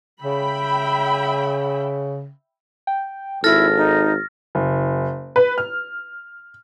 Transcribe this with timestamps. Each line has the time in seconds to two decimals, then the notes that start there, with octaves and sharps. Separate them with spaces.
0.22 C#3 E5 G5 B5
2.87 G5
3.44 G#1 E4 A4 F6 A6 A#6
3.77 D#4
4.55 F#1
5.36 B4
5.58 F6